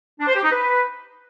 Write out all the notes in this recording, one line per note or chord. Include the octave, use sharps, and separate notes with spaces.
D4
C5
G4
D#4
B4